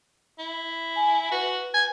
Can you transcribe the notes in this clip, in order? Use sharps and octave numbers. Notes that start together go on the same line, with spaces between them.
E4
G#5
F#4 B4
G#5